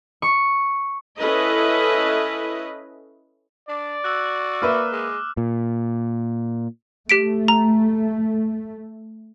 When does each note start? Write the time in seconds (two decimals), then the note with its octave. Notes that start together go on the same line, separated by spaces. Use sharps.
0.22 C#6
1.18 C#4 E4 A4 B4 D#5
3.69 D4 D5
4.04 F#4 E6 F#6
4.62 A#3 B4 E5 D6 F6
4.92 G#3
5.37 A#2
7.09 A3 G4 B6 D7
7.48 A#5